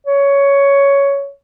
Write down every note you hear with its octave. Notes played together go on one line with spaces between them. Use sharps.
C#5